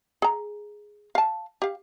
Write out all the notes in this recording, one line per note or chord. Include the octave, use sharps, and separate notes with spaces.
G#4 A#5
F5 A5
G4 F5